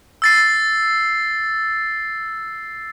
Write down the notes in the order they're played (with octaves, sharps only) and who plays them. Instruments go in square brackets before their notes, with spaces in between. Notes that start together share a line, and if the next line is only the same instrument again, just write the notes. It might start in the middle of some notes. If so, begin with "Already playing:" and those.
[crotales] E6 A6 C7